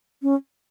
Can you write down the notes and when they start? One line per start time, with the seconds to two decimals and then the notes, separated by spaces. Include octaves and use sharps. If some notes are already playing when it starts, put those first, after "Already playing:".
0.23 C#4